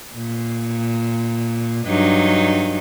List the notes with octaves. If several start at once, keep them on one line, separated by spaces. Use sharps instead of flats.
A#2
G2 F#3 D#4